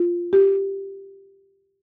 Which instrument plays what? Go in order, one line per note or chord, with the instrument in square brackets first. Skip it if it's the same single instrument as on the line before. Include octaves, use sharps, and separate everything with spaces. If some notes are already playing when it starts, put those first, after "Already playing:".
Already playing: [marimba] F4
G4